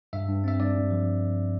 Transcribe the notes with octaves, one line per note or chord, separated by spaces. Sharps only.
G2 E5
G2
C4 E5
G2 D5
G2
F3